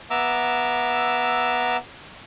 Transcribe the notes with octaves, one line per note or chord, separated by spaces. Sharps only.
B3 E5 A#5 D6 E6